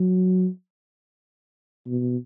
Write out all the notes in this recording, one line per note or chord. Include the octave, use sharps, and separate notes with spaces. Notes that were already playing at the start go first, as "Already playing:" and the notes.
Already playing: F#3
B2